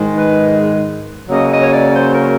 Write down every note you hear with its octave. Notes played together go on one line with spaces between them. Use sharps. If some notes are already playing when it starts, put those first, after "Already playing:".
Already playing: G#2 D#3 G#3
B4
C#3 F#3 A#3 D#5
D#5
C#5
D5
C5
A#4